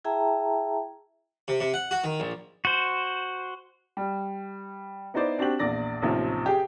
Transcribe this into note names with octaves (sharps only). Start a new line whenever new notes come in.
E4 G#4 E5 G5 A5 A#5
C3
C3
F#5
F#4
D#3
A#1
F#4 C5
G3
B3 D#4 E4 C5 D5
C4 D4 F#4 G4 F#7
A#1 E2 D5 A#6
A1 D#2 C3 F3
G4 G#4